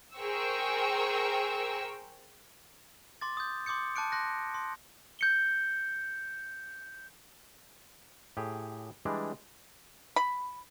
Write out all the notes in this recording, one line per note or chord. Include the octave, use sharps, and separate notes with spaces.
G#4 A#4 C5 G5 C#6 E6
C6 D6 A6
D#6 G6
C6 D6 D#6 G6 C#7
A5 D6 F#6 C#7 D7
C6 F#6 A#6
C6
G6 C#7 G7
A2 G4 G#4
E3 G3 G#3 D4
B5